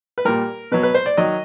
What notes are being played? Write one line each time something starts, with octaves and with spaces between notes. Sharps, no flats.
B4
A#2 G3 A#4
B2 F#3 B4
B4
C5
D5
D#3 F#3 D#5